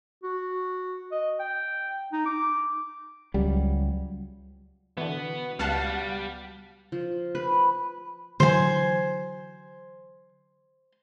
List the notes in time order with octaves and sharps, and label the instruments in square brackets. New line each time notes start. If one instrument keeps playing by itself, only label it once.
[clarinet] F#4
D#5
G5
D#4
D6
[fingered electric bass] C#2 F#3 G3
[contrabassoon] B2 [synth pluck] D3 E3 [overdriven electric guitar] B3
[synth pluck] C#2 [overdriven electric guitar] G3 [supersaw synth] F5 F#5 A5
[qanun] F3
B4
[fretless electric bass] D3 E3 F#3 [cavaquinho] C5 G#5